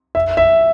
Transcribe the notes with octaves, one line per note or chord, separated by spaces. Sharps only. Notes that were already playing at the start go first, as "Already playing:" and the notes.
E5
E5